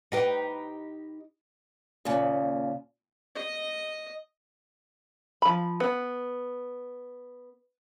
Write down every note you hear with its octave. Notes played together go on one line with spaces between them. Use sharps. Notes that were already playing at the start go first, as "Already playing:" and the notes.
D#4 G4 B4
D#2 A#2 C#3
D#5
F3 B5
B3